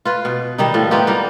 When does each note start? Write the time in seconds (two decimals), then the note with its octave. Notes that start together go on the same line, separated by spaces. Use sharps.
0.05 F4 B4
0.25 B2
0.58 D#3 G3 D#4
0.74 A2 F3
0.91 B3 D#4 F4 G4
1.07 G3 A#3 A#4